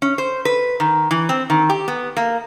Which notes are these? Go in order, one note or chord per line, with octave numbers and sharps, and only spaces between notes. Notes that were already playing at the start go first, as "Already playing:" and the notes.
C#4
C5
B4
D#3
E3
C4
D#3
G4
B3
A#3